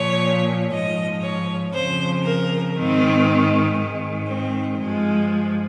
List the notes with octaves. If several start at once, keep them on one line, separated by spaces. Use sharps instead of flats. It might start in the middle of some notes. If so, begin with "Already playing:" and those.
Already playing: A#2 F3 C#5
G#2 F3 D#5
C#5
F2 C#3 F3 C5
A#4
G#2 D#3 C4
G#2 D#3
C4
G2 F3 G#3